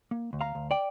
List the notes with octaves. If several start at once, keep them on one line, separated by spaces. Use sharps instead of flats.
A#3
D2
F5 A#5
D2
D5 G5